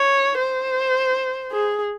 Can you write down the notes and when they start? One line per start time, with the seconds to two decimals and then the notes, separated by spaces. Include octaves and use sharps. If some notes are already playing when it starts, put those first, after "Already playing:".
Already playing: C#5
0.38 C5
1.52 G#4